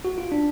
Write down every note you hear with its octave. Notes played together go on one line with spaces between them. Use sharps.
F#4
F4
D4